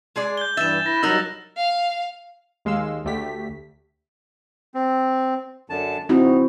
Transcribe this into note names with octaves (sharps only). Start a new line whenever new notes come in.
G#3 G#4 D5
G6 G7
G2 E3 E5 A6 E7
E4 B4 A#6
G2 F#3 D#4 A#4 F#5 E6 A#6
F5
D#2 G#3 F5 C6 E6
D2 A3 G4 B6
C4
F#2 D3 A5
C4 D#4 E4 F#4